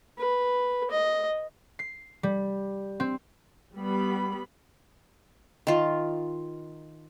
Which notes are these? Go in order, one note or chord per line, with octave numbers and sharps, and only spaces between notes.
B4
D#5
C7
G3
C4
G3 B3 B5
D#3 F4